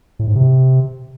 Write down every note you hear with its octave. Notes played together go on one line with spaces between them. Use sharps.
A2
G#2
C3